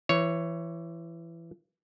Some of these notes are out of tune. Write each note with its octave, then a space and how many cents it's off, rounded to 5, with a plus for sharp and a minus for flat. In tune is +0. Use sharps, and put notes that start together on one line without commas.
E3 +20 C#5 +0